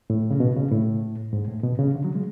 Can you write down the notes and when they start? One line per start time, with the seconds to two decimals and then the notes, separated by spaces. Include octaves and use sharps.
0.10 A2
0.31 C#3
0.40 B2
0.56 C#3
0.71 A2
1.33 G#2
1.48 A2
1.63 B2
1.79 C#3
1.95 D3
2.04 F#3
2.15 G#3